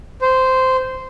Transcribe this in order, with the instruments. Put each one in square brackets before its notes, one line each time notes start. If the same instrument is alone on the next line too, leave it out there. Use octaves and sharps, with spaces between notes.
[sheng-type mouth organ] C5